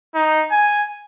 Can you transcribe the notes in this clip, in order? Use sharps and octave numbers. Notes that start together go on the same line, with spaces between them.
D#4
G#5